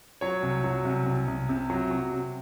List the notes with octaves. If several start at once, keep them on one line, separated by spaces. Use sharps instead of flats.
F#3 C#5
C2
F#3
C2
C2
C2
C3
F#3
F#3
C3